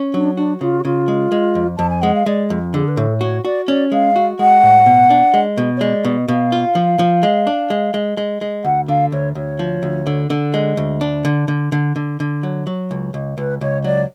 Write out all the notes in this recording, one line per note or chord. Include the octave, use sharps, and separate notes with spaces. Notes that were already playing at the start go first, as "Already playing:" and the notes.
Already playing: C#4
F#3 D4
D4 F#4
C#3 F4
F#4
C#3 F4
G#3
G#3
F2
F2 A5
G#5
G#3 F#5
F5
G#3 D5
F2
D3 G#4
B4
A2 A4
F#4 C#5
F#4 D5
C#4 D5
G#3 F5
F#4
G#3 F#5
A2
B2
D4
G#3
B2
C#5
G#3 D5
B2
B2 F5
F4
F3
F3
G#3
D4
G#3
G#3
G#3
G#3
D2 F#5
D3 F5
D2 C#5
D2 C#5
F3
D2
D3
D3
G#3
D2
D4
D3
D3
D3
D3
D3
F#3
F#3
C#2
C#2
C#2 B4
C#2 C#5
F#3 D5